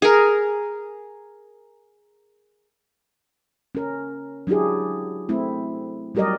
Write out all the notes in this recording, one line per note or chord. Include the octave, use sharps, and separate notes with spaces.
G#4 A#4
C#4 A#4
F#3 D4 E4 G4 G#4
A3 C4 E4
F#3 G3 G4 A#4 D5 D#5